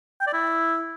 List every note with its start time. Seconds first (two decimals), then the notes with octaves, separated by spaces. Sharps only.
0.20 G5
0.27 D5
0.33 E4